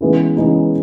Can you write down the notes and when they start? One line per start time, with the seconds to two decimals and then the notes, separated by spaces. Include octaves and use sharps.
0.01 C#3 E3 G#3 B3 D#4
0.37 C#3 E3 G#3 B3 D#4